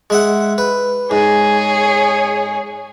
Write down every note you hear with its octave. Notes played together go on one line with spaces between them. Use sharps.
G#3 E5 F#5
B4
G#2 G#4 C#5